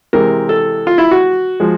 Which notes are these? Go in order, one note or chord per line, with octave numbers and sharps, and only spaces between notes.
C3 E3 G#3 C4 A#4
A4
F4
E4
F#4
F3 G#3